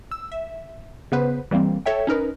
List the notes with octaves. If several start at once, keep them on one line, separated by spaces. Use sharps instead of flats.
E6
E5
C#3 B3 B4 C5
E3 G3 A#3 C4
A4 C#5 E5 G5
C#4 D#4 A#4 B4